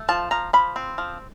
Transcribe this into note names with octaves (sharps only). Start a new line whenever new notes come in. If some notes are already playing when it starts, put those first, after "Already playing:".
Already playing: A3
F3 A5
F3 A#5
F3 B5
C4
F3